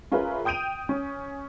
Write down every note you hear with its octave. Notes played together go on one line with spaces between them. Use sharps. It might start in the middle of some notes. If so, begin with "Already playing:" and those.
C#4 F4 G#4 A#4 B4 E5
G5 D#6 G6 D7 D#7 F7
C#4